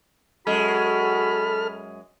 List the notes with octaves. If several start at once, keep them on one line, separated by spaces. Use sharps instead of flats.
F#2 G#3 F#4 A4 B5 F6